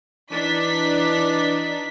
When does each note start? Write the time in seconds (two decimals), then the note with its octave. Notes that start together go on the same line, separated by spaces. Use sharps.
0.31 E3 D4 D#4 B6